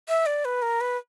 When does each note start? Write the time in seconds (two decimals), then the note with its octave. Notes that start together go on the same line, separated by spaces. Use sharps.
0.09 E5
0.26 D5
0.45 B4
0.62 A#4
0.81 B4